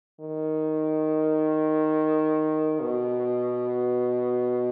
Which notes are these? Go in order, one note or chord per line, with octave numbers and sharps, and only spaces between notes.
D#3
B2